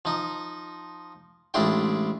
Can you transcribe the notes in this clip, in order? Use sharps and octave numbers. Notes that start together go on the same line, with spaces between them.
F3 D#4
A1 G#3 D4 E4 F4 G5